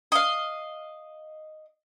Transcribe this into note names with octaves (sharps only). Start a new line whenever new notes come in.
D#5 F5